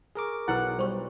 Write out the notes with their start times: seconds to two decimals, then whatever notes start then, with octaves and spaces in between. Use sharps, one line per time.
0.15 G#4 A#4 C#6 D6 A#6
0.48 B1 E4 B4 F#5
0.79 G3 C5 C#6